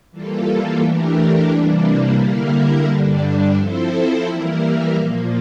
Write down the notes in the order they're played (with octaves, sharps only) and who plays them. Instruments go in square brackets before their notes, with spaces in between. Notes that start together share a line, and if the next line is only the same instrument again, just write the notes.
[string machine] E3 G3 A#3 F4 A4
E3 A3 D4 G4 A#4
C3 E3 G3 A#3 D4
D3 G3 A#3 E4 A#4
G2 D3 G3 D4
F3 C4 E4 A4 C5
E3 G3 A#3 E4 A#4
A#2 F3 A#3